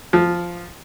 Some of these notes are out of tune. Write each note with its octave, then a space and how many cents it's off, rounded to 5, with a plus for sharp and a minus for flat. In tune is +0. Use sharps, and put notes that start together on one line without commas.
F3 -5